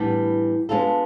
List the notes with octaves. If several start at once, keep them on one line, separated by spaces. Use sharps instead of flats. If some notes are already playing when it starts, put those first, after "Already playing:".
Already playing: A2 E3 G3 B3 D4
G#3 B3 D4 F4 A4